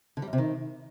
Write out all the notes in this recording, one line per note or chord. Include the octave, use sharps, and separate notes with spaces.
D3
G3
F#2
C3
D#3